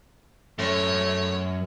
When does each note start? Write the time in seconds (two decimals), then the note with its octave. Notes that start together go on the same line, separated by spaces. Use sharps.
0.59 F#2 A3 C#5